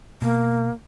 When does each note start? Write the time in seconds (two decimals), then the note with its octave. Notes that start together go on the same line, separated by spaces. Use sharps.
0.22 B2 A#3